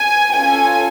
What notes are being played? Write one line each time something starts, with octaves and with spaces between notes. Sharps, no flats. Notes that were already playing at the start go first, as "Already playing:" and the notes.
Already playing: G#5
C#4 F4 A4 G#5